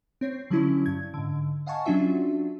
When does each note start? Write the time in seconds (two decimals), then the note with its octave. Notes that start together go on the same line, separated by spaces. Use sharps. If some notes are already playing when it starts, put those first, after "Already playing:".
0.21 C4 C#5 C7
0.50 D3 F#3 G3 C#4 E4
0.86 G2 G#6
1.14 G#2 D3
1.66 D#5 F5 F#5 G#5 A5 C#6
1.86 F#3 C#4 D4 F4 F#4 E5